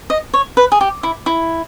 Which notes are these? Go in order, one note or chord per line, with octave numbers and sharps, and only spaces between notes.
D#5
C#5
B4
G#4
G4
E4
E4